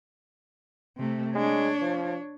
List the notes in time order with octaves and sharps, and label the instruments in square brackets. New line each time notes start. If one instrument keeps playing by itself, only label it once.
[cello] C3 A3
[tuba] G#3 [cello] D4 C#5
[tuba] F3